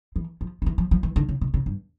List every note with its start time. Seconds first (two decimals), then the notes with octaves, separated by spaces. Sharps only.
0.16 E3
0.41 F3
0.62 D#3
0.66 E3
0.78 F3
0.91 F3
1.03 E3
1.16 D3
1.29 C#3
1.41 C3
1.54 C#3
1.66 G2